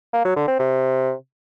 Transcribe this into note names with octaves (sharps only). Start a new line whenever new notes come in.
A#3
F#3
D3
C4
C3